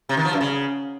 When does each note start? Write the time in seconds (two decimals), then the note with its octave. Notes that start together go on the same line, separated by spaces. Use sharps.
0.09 C3
0.17 D#3
0.25 F3
0.33 F#2
0.41 C#3